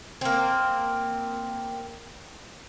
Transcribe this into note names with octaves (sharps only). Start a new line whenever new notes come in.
A#3 C4